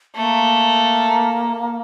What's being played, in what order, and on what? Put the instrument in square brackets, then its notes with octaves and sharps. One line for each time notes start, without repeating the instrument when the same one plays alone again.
[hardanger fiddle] A3 [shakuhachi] A#3